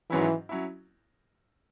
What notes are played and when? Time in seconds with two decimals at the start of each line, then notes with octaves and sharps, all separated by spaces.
0.10 G#2 D#3 E3 F#3 C#4 E4
0.49 F#3 C#4 E4